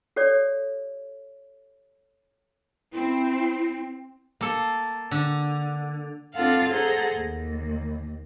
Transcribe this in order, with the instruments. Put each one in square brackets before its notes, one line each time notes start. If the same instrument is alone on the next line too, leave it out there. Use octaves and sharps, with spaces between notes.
[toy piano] G4 A4 C#5 D5
[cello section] C4 [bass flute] E4
[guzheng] A#3 A4
D3
[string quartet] C4 D4 F4 A4 F5 F#5
G#4 A4 C5 F#5 A#5
D#2